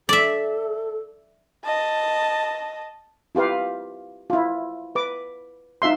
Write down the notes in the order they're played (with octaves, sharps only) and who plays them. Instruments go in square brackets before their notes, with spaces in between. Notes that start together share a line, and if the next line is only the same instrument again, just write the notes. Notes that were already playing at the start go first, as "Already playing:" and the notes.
[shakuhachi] A4 [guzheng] D5 E5
[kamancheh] D#5 A5
[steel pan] E4 F4 G4 B4 F5
E4 F4
B4 D6
D#4 F4 E5 C6